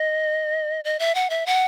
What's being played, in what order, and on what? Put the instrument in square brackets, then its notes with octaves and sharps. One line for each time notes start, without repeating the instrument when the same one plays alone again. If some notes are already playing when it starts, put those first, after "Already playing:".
Already playing: [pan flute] D#5
D#5
E5
F#5
E5
F#5